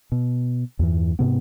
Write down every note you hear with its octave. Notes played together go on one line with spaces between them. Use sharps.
B2
E2 G2 E3
G#2 C3 B3